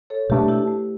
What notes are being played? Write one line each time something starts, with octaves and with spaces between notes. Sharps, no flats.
A4 C#5
B2 A3 D4 G4 B4
E4 G4
A3